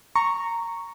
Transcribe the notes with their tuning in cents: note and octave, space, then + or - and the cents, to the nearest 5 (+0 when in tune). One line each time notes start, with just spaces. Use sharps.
A#5 -10 C#6 +0